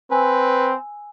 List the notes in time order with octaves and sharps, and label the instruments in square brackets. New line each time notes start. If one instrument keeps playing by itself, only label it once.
[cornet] C4 [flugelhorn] B4 [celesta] G#5 E6